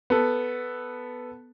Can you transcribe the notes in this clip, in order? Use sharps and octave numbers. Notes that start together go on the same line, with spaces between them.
B3 A4